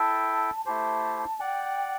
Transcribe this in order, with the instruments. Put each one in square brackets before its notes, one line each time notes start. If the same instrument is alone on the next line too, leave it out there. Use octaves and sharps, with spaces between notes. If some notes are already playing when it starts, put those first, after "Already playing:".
Already playing: [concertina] E4 A4 E5 G5 [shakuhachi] A5
[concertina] A3 E4 G4 C5 [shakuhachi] A5
[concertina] D5 F#5 [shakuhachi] G5